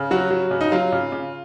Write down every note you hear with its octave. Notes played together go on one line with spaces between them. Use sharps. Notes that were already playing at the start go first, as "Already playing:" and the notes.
Already playing: C#3
F#3 F#4
F#3
C#3
D#4
F#3 F4
C#3
C#3